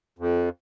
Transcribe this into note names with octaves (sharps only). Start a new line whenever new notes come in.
F2